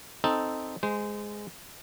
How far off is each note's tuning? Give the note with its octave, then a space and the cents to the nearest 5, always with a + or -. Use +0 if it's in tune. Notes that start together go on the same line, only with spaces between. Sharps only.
C4 +0 D#4 +0 A4 +0
G#3 +0 C5 -25